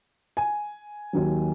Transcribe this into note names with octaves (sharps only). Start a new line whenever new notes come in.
G#5
D#2 D#3 F#3